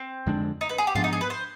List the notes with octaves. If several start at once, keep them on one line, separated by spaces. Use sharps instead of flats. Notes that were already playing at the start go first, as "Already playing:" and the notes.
Already playing: C4
F2 D3 G#3 D4
D#4
B4
G#4
G4
G#2 F3 B3 D4 F4
D#4
G#4
B4
C5